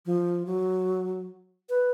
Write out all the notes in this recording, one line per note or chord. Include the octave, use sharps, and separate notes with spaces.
F3
F#3
B4